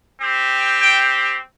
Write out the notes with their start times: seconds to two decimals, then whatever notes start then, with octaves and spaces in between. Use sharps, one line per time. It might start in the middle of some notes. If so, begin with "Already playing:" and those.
0.20 C4 G4
0.80 G5